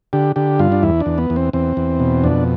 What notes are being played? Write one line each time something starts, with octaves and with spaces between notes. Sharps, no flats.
D3 G4
D3 G4
G2 F4
D4
E2 E4
D4
E2
B3
E2
C4
E2 C4
E2
B2
F2 D4